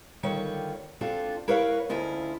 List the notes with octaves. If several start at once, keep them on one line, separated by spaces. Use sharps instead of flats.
D3 D#3 G3 F4 C#5 G5
C4 D4 F4 F#4 A4
E4 A#4 B4 C#5 F5 F#5
D2 C#4 E4 F4 D#5